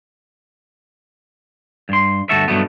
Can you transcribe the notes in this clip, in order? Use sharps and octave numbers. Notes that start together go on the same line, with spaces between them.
G2 C6
D2 G2 F#4 A4 E5
G2 B2 F#3 A3 B3